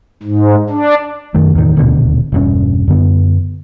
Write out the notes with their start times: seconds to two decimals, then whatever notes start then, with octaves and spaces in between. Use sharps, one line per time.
0.23 G#2
0.70 D4
1.34 F#2 D#3 A3
1.55 E2 A2 D#3
1.77 D#1 D2 B2 D3
2.32 E1 G2 C#4
2.88 F#2 D3 B3